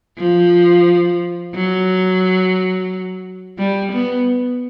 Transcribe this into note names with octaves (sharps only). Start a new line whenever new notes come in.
F3
F#3
G3
B3